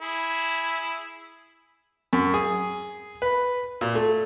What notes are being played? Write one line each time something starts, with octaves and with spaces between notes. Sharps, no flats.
E4 G#4
F#2
G#4
B4
A#2
A3